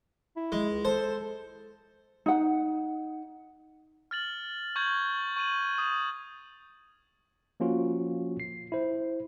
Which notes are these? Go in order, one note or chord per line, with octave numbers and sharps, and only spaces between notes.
E4
G#3
C#2
A4 C5
D#4 F#5
F6 A6 F#7
C#6 G6 G#6 F#7
C#6 D#7 F#7
D#6
F3 A#3 C#4 F4 F#4
C7
E4 C5